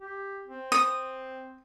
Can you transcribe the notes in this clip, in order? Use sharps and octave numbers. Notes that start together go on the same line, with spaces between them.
G4
C4
D#6